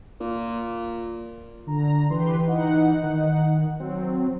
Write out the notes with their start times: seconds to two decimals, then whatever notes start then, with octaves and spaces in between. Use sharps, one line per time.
0.21 A#2
1.67 D3 A#5
2.10 E3 G4 B4 C6
2.46 D#4 F#5
3.04 D#3
3.80 F#3 C4